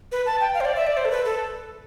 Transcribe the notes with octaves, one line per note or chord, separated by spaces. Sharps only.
B4
A5
G5
F5
C5
D5
E5
D5
C5
A4
B4
A4